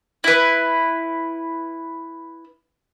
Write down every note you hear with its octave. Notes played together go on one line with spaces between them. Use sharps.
E4 B4